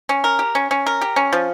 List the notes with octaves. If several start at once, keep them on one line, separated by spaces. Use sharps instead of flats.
C#4
A#4
G4
C#4
C#4
A#4
G4
C#4
F3